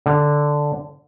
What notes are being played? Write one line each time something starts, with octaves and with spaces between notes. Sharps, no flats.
D3